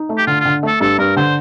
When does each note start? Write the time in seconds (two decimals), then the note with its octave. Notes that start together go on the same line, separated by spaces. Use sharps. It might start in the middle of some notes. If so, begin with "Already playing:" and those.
Already playing: D#4
0.09 A3
0.18 G4
0.27 D3 F4
0.40 F4
0.45 D3
0.63 A3 A4
0.81 G2 A4
0.98 G2 A#4
1.17 D3 C5